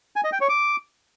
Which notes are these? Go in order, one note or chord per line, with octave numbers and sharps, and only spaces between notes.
G#5
D#5
G5
C#5
D6